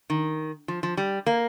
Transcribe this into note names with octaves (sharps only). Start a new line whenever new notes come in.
D#3
F3
F3
G3
A#3